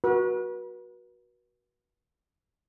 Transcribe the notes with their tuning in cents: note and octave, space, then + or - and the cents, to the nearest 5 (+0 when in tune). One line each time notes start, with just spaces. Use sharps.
F#4 +0 B4 -40